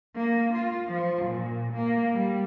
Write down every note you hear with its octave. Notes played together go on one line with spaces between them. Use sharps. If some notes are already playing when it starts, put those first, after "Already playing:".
A#3
F4
F3
A#2
A#3
G3